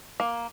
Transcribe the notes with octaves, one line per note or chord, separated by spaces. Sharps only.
A#3